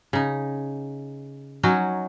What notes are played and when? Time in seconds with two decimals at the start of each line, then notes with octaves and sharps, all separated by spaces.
0.13 C#3 D#4
1.63 F#3 C#4 D#4 F#4